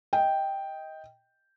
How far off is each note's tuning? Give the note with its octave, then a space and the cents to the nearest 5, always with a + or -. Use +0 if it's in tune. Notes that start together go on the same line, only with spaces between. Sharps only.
D#5 +20 G5 +0